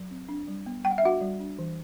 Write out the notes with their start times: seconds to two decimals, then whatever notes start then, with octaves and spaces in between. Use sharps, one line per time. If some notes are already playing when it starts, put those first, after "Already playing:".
Already playing: F#3
0.11 C4
0.29 D4
0.48 G3
0.66 B3
0.84 G3 G5
0.91 F#5
0.98 E5
1.03 D4 F#4 F#5
1.21 G3
1.40 D4
1.59 E3